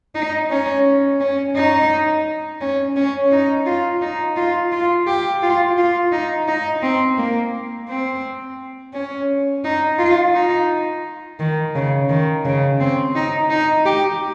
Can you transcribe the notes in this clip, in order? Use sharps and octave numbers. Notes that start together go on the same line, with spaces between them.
D#4
C#4
C#4
D#4
C#4
C#4
D#4
F4
D#4
F4
F4
G4
F4
F4
D#4
D#4
C4
A#3
C4
C#4
D#4
F4
D#4
D#3
C#3
D#3
C#3
C4
D#4
D#4
G4